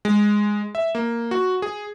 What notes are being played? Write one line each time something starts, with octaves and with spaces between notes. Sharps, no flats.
G#3
E5
A#3
F#4
G#4